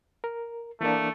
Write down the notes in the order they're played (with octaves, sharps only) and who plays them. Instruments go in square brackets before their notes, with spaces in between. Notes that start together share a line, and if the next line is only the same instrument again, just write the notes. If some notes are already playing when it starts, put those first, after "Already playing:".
[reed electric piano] A#4
[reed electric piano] E3 A#3 D4 [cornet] A3